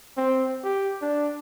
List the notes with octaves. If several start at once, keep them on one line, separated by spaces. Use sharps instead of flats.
C4
G4
D4